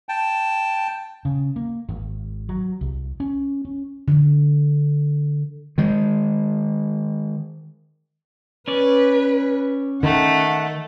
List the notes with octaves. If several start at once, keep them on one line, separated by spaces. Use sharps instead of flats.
G5 A5
C#3
A#3
G#1
F#3
C2
C#4
C#4
D3
D#3 G#3
C#4 B4 D5
D#3 A3 F#5